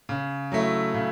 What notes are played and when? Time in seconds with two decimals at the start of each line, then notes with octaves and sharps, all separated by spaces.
0.09 C#3
0.52 F#3 A3 E4
0.94 C#3